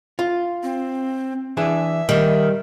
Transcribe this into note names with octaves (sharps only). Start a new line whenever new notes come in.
F4
C4
E3 D4 G#4 E5
D#3 G3